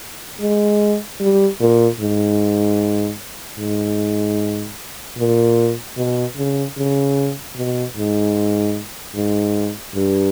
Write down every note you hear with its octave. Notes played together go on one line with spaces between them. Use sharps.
G#3
G3
A#2
G#2
G#2
A#2
B2
C#3
C#3
B2
G#2
G#2
G2